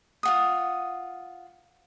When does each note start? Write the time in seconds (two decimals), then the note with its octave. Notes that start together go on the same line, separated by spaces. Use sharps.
0.23 F4 F#5 D#6